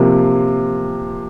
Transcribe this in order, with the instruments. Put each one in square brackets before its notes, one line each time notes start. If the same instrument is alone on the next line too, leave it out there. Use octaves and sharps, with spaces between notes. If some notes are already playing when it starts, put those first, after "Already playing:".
Already playing: [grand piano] C3 F3 A#3